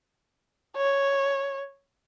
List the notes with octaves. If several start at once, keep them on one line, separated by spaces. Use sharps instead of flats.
C#5